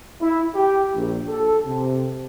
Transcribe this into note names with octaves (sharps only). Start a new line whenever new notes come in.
E4
G4
A#1
A4
C3